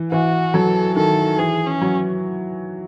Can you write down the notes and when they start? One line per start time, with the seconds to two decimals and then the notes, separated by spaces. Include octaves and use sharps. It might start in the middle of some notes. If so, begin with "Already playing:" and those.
Already playing: E3
0.12 E3 F#4
0.54 F#3 A4
0.96 D#3 A4
1.38 E3 G#4
1.66 C#4
1.81 F#3